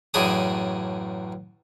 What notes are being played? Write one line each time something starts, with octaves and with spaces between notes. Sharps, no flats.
A1 F#2 D4 G#4 D#6